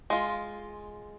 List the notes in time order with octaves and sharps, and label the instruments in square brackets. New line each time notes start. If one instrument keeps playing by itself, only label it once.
[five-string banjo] G#3 F4